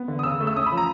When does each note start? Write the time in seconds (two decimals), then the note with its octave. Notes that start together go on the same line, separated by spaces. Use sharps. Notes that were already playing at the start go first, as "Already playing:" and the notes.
Already playing: B3
0.08 D3
0.19 D#6
0.23 C#3 E6
0.40 A3
0.47 E6
0.56 C#4 D#6
0.66 B5
0.72 F3
0.77 A#5